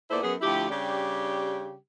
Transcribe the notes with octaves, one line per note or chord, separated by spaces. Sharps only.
A#2 B3 E4 A4 C5 D5
F#2 B3 G#4
D2 F3 E4 G4
C#3 G3 D4 G4